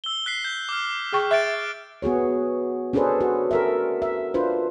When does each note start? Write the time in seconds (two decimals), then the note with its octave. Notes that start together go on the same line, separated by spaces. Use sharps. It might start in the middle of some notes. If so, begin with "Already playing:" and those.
0.04 E6 G7
0.26 F#6 B6 C7
0.44 G6
0.69 D6 F6
1.12 G#4 G5 C#6
1.31 E5 F#6 A6 D7
2.02 B3 F#4 G#4 C#5
2.93 C#4 D4 G#4 A4 B4 C5
3.21 F#4
3.51 A4 A#4 E5
4.02 E5
4.34 D4 F4 B4 C5